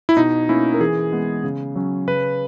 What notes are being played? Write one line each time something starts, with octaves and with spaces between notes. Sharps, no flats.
E4
B2 D#4
A#3 C#4 E4
A#4
E3 G#4
G#3 B3
C#3
F#3 C#4
C#3 B4